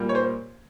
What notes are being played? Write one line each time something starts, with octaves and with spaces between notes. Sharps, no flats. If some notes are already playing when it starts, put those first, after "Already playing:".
Already playing: A#2 G3 A#3
C#5
C5